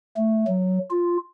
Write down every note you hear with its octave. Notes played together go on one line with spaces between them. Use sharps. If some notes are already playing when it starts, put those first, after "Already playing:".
A3
F#3
F4